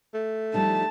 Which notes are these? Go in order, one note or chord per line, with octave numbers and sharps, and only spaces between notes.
A3
F3 G3 D#4 A5